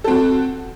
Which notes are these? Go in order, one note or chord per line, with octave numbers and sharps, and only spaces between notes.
C4 F#4 A4